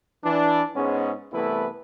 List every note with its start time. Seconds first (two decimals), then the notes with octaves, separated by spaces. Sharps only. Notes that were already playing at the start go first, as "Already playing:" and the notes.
0.23 E3 D4
0.75 G#2 G#3 B3 C#4
1.33 C2 E3 A3 B3 E4 B4